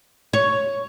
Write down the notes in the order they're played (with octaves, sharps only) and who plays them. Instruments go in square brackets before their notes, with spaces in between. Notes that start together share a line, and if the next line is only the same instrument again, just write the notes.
[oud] C#5